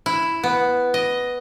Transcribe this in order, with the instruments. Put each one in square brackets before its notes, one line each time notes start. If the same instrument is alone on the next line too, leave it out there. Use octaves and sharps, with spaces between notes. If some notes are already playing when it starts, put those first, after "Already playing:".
[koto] E4
B3
D#5